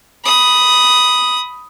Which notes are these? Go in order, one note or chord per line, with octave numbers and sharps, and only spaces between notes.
B5 D#6